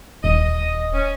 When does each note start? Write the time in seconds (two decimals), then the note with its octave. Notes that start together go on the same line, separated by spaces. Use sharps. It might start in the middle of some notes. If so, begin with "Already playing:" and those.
0.24 D#1 D#5
0.93 C#4